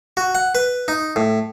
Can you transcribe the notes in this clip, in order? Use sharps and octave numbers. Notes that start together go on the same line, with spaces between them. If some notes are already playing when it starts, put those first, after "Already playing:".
F#4
F#5
B4
D#4
A2